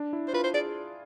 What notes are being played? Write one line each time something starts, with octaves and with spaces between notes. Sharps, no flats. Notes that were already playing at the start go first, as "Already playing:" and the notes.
Already playing: D4
E4
C5
F4 B4
C5
G#4 D5